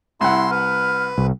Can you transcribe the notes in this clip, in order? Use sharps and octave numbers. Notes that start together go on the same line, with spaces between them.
C2 E4 F#5 C6
B4 F6
C2